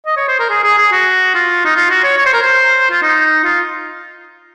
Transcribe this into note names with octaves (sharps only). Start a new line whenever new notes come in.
D#5
C#5
C5
A#4
G#4
G#4
G#4
F#4
F4
D#4
F4
F#4
C#5
C#5
C5
A#4
C5
F4
D#4
F4